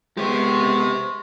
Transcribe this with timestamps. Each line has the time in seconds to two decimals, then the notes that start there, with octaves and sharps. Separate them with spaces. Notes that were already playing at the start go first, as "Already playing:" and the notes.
0.17 G#3 B3 G4 C5 C6 C#6